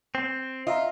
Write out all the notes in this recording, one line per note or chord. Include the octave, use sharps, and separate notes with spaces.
C4
F4 D#5 E5 A#5